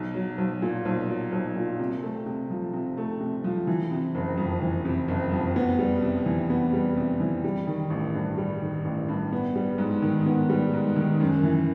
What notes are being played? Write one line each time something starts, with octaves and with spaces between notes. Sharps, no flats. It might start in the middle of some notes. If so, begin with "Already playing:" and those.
Already playing: B1
F#3
B1
A#2
B1
F#3
B1
A#2
C3
A3
C3
F3
C3
A3
C3
F3
E3
C3
F#1
F2
E3
C3
F#1
F2
B3
G3
C3
E3
B3
G3
C3
E3
G3
D#3
A1
G2
G3
D#3
A1
G2
B3
G3
G#2
D#3
B3
G3
G#2
D#3
F#2
E3